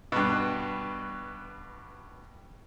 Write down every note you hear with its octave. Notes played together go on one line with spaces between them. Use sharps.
G2 B2